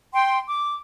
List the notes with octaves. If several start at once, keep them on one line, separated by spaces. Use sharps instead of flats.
G5 C6
D6